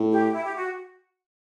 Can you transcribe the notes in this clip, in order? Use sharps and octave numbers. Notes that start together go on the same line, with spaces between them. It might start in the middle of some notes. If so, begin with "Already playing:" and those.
Already playing: A2
G4
E4
G4
F#4